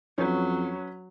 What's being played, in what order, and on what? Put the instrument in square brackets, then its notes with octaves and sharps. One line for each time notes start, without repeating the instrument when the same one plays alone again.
[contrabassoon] F2 [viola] F#3 [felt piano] C#4 B4